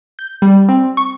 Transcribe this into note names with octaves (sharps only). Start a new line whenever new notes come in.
G6
G3
C4
C#6